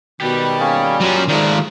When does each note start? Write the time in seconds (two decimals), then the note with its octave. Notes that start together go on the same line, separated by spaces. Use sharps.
0.21 B2 D#3 G3 G4 F#6
0.60 A#3 C#4 G#4
1.01 F#3 A#3 C#4 F4
1.28 D#3 F3 G#3 A3 D5